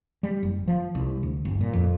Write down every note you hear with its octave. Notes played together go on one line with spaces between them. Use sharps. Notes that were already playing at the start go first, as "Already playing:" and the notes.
G3
F#1
F3
C2
D2
G1
A#2
F2